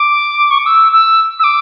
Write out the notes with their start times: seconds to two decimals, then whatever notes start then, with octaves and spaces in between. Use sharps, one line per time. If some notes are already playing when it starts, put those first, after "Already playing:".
Already playing: D6
0.51 C#6
0.58 D6
0.66 E6
0.92 E6
1.39 E6
1.44 D6